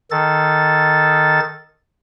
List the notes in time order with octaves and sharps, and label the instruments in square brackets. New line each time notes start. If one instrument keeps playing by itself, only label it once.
[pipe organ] D#3 A4 A6